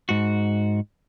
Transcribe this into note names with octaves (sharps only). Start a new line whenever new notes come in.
G#2 F#4